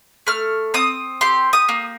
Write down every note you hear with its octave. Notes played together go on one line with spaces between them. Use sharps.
A3 F6
C4 D#6
G4 C6
D#6
A#3